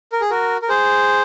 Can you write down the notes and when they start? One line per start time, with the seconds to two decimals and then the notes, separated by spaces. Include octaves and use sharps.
0.12 A#4
0.21 G#4
0.30 F#4 A#4
0.62 A#4
0.69 G#4 C5